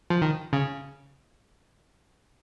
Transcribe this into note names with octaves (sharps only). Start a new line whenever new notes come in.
F3
D#3
C#3